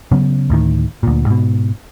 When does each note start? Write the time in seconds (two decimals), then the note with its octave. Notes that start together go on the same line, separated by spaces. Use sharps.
0.12 C#3 F#3 B3 C#4
0.50 D2 A2 D#3
1.03 D2 A#2
1.26 G#2 B2